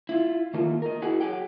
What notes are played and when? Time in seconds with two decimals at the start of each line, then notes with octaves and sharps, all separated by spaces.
0.09 E4 F4
0.54 D#3 A3 A#3 F4
0.82 A#4 D#5
1.02 E4 F#4 G#4 F#5
1.21 F#3 G#4 F#5 G5